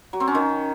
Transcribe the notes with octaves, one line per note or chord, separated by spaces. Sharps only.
F#3
C4
C#4
D#3